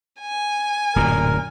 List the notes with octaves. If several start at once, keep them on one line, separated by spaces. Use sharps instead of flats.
G#5
D1 F#2 A#2 A#4